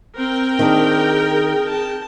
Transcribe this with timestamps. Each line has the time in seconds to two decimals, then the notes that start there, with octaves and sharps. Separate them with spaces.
0.17 C4 A#4 G5
0.59 D#3 D4 G#4
1.67 A5